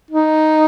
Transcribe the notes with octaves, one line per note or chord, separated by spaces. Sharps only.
D#4